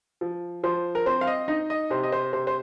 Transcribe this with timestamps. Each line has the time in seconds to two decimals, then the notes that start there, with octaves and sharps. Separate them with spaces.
0.21 F3
0.63 F3 C5
0.95 A#4
1.06 C4 C5
1.21 F5
1.27 D#5
1.48 D#4 D#5
1.70 D#5
1.90 C3 C5
2.03 D#5
2.12 C5
2.33 C3 C5
2.47 C5